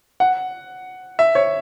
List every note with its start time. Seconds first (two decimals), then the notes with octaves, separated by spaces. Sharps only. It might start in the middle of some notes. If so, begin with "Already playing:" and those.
0.20 F#5
1.19 E5
1.35 C#5